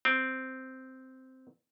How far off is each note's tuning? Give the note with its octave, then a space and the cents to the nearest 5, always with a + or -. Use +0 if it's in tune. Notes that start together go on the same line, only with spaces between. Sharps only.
C4 -5